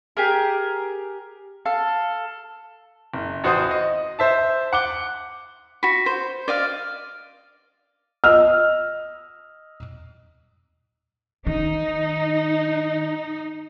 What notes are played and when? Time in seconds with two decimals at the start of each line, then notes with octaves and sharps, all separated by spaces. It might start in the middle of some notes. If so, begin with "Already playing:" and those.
0.17 G4 G#4 A#4
1.65 A4 F5
3.14 F#1
3.44 A1 F#4 C5 C6 D#6
3.71 D#5
4.19 C5 E5 A5
4.73 F#5 D6 G7
5.83 F#4 B5
6.06 C5
6.48 D5 D#5 F5
8.24 D#5 E6 F6
11.47 D#3 D#4